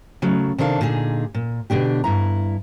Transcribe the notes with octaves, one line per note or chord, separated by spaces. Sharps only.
C#3 F#3 A3
C3 D#3 D4 A4 F5
A#2 D3 D#4 G#4
A#2
B2 D3 D4 G4
G2 E4 A#5